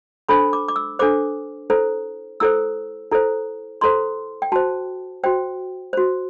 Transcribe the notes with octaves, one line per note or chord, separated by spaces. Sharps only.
D4 A4 C5 B5
D6
D6
E6
D4 A4 C5 D6
E4 A4 C5
E4 A4 C5 E6
E4 A4 C5
E4 A4 C5 C6
G5
F#4 C5 A5
F#4 C5 G5
F#4 C5